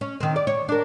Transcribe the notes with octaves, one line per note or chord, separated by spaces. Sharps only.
C#4
D#3 C4
D5
C#5
D4 A#4